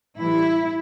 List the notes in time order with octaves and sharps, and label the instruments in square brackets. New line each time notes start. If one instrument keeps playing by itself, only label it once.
[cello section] A2 E3 G3 E4